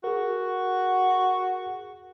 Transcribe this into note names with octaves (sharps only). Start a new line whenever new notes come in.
F#4 G#4 A#4